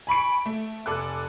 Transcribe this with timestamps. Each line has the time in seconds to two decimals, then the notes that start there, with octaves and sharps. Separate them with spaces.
0.07 G#5 B5 C#6 D7
0.46 A3
0.86 F1 A4 G#5 D6 F#6